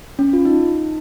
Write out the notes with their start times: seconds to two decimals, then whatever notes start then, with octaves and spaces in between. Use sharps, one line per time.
0.19 C#4
0.33 F4
0.45 D#4